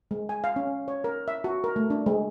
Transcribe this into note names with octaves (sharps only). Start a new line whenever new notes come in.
G#3
G#5
F5
C#4
C#5
A#4
E5
F#4
A#4
A3
D4
G#3